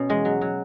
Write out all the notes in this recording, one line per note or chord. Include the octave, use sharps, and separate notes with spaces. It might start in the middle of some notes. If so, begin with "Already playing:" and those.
Already playing: B2 C#4
E2 G#3
F#3
F#3